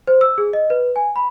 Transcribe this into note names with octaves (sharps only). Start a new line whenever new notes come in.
C5
E6
G#4
D#5
B4
G#5
B5